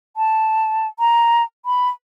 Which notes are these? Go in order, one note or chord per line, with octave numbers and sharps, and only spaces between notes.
A5
A#5
B5